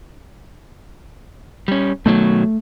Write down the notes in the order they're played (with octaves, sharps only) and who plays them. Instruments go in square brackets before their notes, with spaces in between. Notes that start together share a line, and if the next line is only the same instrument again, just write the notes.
[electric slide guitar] G3 C#4
[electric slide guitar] B2 D#3 F#3 [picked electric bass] A3